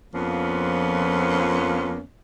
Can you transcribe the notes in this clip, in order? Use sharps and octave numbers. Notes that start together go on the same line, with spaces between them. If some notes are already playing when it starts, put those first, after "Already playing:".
F2 F3 A#3 B3 C#4